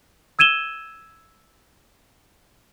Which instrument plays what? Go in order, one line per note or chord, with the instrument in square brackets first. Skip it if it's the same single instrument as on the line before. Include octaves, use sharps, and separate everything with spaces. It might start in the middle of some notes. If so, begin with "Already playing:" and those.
[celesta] E6 G#6 D#7 E7 G7